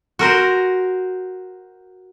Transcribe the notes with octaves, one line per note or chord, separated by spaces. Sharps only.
F#4 A#4 C5